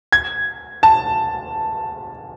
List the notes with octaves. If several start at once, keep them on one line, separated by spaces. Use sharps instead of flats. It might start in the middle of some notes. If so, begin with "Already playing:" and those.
G#6
A5